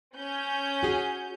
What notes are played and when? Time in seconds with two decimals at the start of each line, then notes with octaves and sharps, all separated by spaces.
0.15 C#4 G6
0.83 F#4 G#4